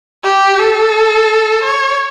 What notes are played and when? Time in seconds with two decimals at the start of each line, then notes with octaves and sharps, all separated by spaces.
0.24 G4
0.59 A4
1.63 C#5